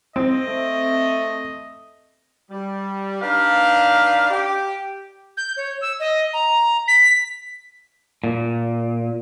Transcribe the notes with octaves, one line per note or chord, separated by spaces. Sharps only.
C4 D#5
A3
G3
D4 D#4 B4 F5
G4
G6
C#5
E6
D#5
A#5
B6
A#2